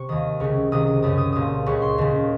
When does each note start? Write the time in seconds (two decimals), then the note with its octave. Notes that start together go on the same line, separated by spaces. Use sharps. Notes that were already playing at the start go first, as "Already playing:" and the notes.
Already playing: C3 C#6
0.09 D#2 D#3 D#6
0.40 C#2 C#3 C#6
0.72 C#2 C3 D#3 D#6
0.87 D#6
1.03 F#2 C#3 D#6
1.18 D#6
1.32 C2 A#2 D#6
1.66 C#2 C#3 C#6
1.82 C6
1.98 D#2 C#3